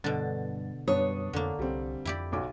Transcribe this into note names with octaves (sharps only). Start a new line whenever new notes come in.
G2 B2 D3 A6
F#2 G3 B3 D4 C#5 D#6
F2 D3 A#3
C2 G3 C4
F2 E4 G4 D5
B1 F#4 D6